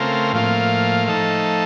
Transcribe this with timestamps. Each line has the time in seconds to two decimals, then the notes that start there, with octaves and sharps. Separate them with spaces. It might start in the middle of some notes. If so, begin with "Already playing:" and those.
Already playing: C#3 A3 C4 F4 A#4
0.33 A2 F3 A#3 F4
1.07 F3 A3 D#4 A4